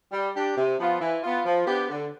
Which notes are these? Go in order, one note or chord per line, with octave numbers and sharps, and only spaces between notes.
G3
D4 G4
C3
F3 B3 F4
E3
B3 F4
F3
B3 D4 G4
D3